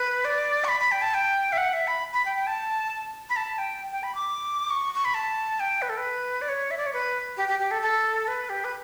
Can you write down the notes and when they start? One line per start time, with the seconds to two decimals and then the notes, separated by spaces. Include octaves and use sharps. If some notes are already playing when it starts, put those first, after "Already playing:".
Already playing: B4
0.25 D5
0.64 C#6
0.68 B5
0.80 B5
0.92 G5
1.02 A5
1.14 G5
1.52 E5
1.58 F#5
1.73 E5
1.87 B5
2.14 B5
2.26 G5
2.36 G5
2.47 A5
3.30 B5
3.36 A5
3.58 G5
3.92 G5
4.03 B5
4.15 D6
4.70 C#6
4.95 C#6
5.05 B5
5.14 A5
5.60 G5
5.82 B4
5.89 A4
5.97 B4
6.42 D5
6.49 C#5
6.71 E5
6.78 D5
6.86 C#5
6.93 B4
7.37 G4
7.49 G4
7.59 G4
7.71 A4
7.82 A4
8.28 B4
8.49 G4
8.64 B4